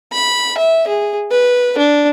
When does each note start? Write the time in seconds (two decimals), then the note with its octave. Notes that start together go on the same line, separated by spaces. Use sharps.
0.13 B5
0.58 E5
0.88 G#4
1.31 B4
1.78 D4